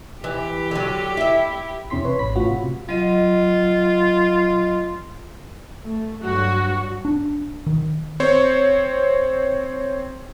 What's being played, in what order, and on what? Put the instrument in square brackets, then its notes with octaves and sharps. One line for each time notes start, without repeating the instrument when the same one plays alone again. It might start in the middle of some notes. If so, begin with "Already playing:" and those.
[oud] E3 [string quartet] G4
[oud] D3 F#3
E4 E5
[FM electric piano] E2 C3 C#4 E4 C6 B6
B4 C#5
A1 B5 B6
A2 C#4 F4 F#4
C3
[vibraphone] F#3 D#5 [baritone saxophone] F4
[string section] A3
[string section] G2 F#3 [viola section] F#4
[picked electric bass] D4
D#3
[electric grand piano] C4 C5 C#5